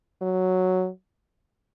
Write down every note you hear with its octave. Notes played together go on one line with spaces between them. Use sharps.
F#3